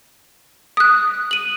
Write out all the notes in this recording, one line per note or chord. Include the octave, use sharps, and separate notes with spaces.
D#6 F#6
D#7 F#7